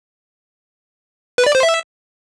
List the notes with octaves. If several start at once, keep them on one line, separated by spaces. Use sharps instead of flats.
B4
D5
C5
E5